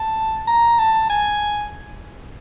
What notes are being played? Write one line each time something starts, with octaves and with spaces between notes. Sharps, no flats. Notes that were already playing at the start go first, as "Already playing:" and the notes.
Already playing: A5
A#5
A5
G#5